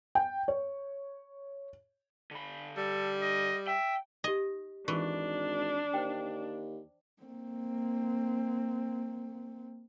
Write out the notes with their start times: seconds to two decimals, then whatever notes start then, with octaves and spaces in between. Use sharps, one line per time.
0.15 G5
0.48 C#5
2.31 D3 B5
2.77 G3 A4
3.22 D#5
3.67 E5 G5
4.24 D#4 G4 D#5
4.88 G#1 E3 D4 C#6
5.94 D#2 C5 G5
7.23 A#3 C4